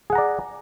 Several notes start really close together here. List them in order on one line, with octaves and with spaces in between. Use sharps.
G#4 F#5 A#5 D5